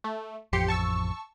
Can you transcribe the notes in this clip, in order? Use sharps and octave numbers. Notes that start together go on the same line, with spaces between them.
A3
A1 F2 G4 C6 C#7
A5 C#6 E6